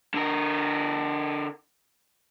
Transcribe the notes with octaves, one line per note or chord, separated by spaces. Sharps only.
D3 A#4